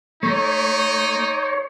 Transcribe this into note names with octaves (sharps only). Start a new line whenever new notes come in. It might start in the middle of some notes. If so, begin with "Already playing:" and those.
A3 D#4 C#5